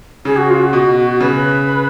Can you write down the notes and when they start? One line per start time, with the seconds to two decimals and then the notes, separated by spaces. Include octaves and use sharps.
0.25 C#3 G#4
0.36 F#4
0.49 F4
0.61 F#4
0.73 B2
1.20 C#3 B4